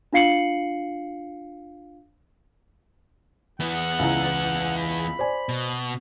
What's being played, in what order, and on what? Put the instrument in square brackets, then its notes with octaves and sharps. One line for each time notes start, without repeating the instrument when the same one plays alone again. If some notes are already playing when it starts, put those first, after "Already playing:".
[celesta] D4 F4 F5 C7 C#7 F#7
[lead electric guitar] E2 B3 [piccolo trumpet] F#5
[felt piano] C#2 E4 A#5
[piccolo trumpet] B5
[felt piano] C5 D5 G#5
[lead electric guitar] B2